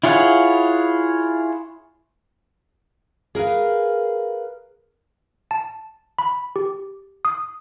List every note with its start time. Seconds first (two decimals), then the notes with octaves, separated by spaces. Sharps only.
0.04 E4 F4 G#4 C#5 F#5
3.35 G#4 A#4 B4 F5
5.51 A5
6.19 B5
6.56 G4
7.25 D#6